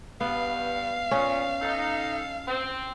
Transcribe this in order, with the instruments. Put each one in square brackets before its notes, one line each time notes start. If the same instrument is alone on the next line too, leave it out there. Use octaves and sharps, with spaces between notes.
[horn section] G2 [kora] B3 [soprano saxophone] F5
[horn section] A#2 [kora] C#4
[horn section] D#4 A4
C4